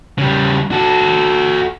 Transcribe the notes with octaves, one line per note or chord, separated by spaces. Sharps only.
C#3 G3
F#4 A4